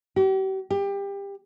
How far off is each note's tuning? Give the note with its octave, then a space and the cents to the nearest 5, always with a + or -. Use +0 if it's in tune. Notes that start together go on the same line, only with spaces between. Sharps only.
G4 -40
G4 +25